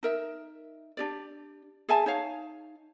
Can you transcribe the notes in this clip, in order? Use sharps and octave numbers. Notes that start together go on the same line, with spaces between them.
D#4 A#4 E5
D4 G4 D5
G#4 E5 G#5 A5
D#4 C#5 F5